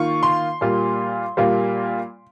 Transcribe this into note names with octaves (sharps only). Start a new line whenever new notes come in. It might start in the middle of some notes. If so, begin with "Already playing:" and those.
Already playing: D#3 A#3 F4 C#6
C6
A#2 G3 A#3 F4
A#2 G3 A#3 F4